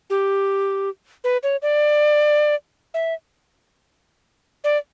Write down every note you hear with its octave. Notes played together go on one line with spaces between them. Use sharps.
G4
B4
C#5
D5
E5
D5